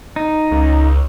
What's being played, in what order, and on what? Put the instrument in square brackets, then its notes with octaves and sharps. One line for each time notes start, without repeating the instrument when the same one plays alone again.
[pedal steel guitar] D#4
[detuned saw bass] C#2